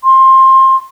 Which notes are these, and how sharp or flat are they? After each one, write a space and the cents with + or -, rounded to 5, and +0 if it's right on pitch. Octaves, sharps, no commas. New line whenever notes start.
C6 +20